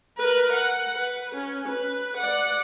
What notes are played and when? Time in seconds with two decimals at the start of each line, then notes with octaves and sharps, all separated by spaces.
0.18 A#4 B4
0.53 F#5
0.94 B4
1.35 C#4
1.68 B4
2.17 D5 F#5